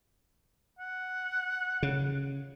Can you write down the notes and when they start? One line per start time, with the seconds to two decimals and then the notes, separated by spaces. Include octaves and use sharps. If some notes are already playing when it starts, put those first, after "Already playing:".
0.79 F#5
1.83 C#3